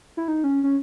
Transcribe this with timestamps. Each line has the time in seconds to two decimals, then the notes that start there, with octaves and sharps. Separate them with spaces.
0.17 E4
0.28 D#4
0.44 C#4
0.64 C#4